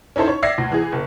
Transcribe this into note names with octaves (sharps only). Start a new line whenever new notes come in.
C#4 D#4 E4 A4 C5
C#5
D5 E5 G#6 A#6 C7
D2
E3 G#4
F#1